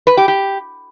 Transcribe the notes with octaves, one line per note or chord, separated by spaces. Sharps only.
B4
G4
G4